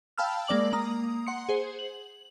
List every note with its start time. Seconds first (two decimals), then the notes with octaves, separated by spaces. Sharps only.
0.18 F5 G5 A5 B5 E6 F6
0.47 G#3 A#3 D5 D6 F#7
0.73 A#3 A#5 D#6
1.27 F#5 C6 C#7
1.49 G#4 C5
1.79 F#7